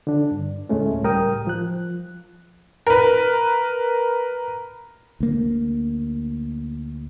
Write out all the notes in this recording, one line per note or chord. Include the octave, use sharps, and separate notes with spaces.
D3 D4
G2
D2 A2 G#3 A3 C#4
C#2 A2 G3 A#4 G5 D#6
F3 F#6
A#4 B4
D2 A#3